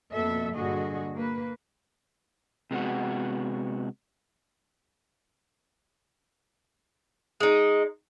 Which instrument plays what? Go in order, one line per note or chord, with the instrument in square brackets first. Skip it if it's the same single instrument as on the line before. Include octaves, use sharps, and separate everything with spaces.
[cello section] F2 B2 A#3 A4 E5
G2 A#2 D3 F#4 G#4 D#5
A#3 B4
[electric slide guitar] C3 G#3 B3 F#4
[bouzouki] G#3 D#4